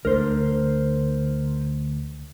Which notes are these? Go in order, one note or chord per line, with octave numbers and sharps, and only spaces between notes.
D2 D3 A#4 C5